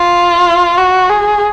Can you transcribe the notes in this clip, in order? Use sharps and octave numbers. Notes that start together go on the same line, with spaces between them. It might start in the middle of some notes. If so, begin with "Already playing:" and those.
Already playing: F4
F#4
G#4